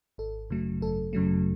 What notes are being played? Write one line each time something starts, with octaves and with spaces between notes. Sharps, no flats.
G#1 A4
F#2 C#3 F#3 A3
G#1 A4
F#2 C#3 F#3 A3